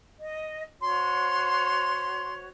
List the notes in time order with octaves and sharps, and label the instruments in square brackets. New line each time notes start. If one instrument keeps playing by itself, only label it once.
[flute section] D#5
[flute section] F#4 C5 C#5 [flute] C6